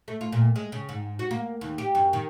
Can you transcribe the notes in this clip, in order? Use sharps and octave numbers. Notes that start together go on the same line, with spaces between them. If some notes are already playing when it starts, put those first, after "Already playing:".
A3
F4
A#2
G#3
C#3
G#2
F#4
A#3
D#2
G4
F#2
D#3